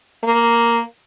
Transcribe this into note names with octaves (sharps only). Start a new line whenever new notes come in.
A#3